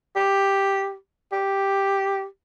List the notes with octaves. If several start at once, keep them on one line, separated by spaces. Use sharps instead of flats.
G4
G4